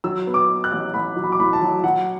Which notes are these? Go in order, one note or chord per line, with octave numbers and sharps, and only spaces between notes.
F#3 E6
B3
D6
B3
F#6
A1
A1 B5
F#3
B5
D6
A2 B5
A5
F#3
F#3 F#5